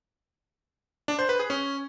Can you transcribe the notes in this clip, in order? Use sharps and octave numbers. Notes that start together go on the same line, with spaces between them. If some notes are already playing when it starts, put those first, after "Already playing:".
D4
C5
B4
G#4
C#4